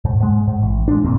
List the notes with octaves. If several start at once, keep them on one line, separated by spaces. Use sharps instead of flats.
G#2
G#2 G#3
G#2
A1
G#3 D4
G#1 F2 A#2 C4